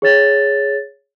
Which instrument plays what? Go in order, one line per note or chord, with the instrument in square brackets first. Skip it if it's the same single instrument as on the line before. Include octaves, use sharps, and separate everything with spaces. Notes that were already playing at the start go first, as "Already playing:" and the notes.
[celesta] G#4 C#5 A6